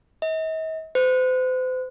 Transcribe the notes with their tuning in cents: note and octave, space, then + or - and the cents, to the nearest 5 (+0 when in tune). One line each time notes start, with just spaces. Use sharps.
D#5 +45
C5 -40